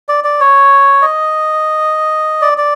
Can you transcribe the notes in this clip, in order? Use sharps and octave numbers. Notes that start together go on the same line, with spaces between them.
D5
D5
C#5
D#5
D5
D5